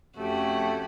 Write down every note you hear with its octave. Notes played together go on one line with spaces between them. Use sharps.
F2 A3 C#4 F#4 G4